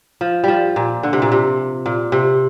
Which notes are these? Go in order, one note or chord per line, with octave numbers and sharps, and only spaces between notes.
F3
F3 G3
A#2
D3
C3
A#2
C3
A#2
C3